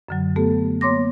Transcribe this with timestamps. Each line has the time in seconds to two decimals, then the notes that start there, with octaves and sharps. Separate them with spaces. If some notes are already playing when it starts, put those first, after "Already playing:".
0.09 F#2 D3 F#3
0.36 A3 B3 G4 A4
0.81 A#3 B3 C#5 C6 D6 A#6